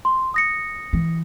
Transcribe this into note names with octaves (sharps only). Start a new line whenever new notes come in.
C6
D#6 A#6 C#7
E3